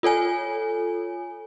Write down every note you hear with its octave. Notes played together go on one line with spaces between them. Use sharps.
F4 A4 C#5 G#5